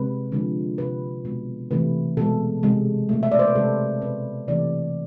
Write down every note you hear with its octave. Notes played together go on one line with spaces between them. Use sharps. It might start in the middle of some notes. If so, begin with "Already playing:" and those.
Already playing: C3 G#3 B4
D3 F3 G#3
C3 G#3 B4
B2 G#3
C3 E3 A3 B4
B2 G#3 A4
C3 G#3
B2 A3
E5
D5
C5
B4
C3 G#3 A4
B2 A3 B4
C3 E3 A3 D5